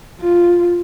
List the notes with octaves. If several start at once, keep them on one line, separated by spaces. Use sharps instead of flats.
F4